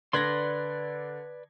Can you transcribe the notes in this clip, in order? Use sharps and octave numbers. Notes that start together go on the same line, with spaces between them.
D3 B4 D5 C6 G#6 A#6